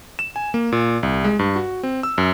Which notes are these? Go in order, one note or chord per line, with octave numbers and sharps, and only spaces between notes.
E7
G#5
A#3
A#2
C2
G#3
G2
F#4
C4
E6
F#2